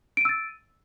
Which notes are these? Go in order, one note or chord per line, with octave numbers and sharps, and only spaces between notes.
E6 A6 D7 D#7